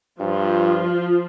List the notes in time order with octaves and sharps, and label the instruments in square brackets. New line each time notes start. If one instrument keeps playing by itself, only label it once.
[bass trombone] G2 [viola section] F3 F4